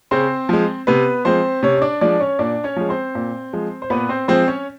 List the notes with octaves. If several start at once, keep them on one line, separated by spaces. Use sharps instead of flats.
C#3 C4 C5
F3 G#3
C3 B3 B4
F3 G#3 C4 C5
C3 C#4 C#5
C#5
D4 D5
F3 G#3 D4 D5
C#4 C#5
A#2 D4 D5
C#4 C#5
F3 G#3
C4 C5
A#2
F3 G#3
C5
A#2 B3 B4
C4 C5
F3 G#3 C4 C5
C#4 C#5